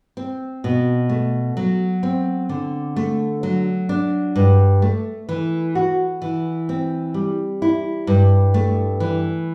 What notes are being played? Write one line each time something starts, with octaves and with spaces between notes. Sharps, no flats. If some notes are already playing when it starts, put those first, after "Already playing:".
C4
B2
A3
F#3
C4
D3
A3
F#3
D4
G2
A3
E3
F#4
E3
C4
G3
E4
G2
A3
E3